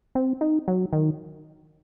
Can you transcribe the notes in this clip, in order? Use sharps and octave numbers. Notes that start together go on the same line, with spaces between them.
C4
D#4
F#3
D#3